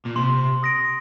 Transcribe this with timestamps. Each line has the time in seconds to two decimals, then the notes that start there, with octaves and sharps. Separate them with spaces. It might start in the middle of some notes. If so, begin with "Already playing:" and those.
0.05 A#2
0.16 C3 C6
0.63 D#6 A#6 D7